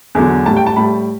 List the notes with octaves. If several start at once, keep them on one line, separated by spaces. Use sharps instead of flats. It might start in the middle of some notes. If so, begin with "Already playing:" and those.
E2 D3 F#3
A2 G3 A5
G5
A5
A2 G3 B5